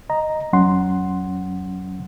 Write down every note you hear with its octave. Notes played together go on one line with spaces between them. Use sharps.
D#5 A#5
F2 F#3 C#4 F#5 C6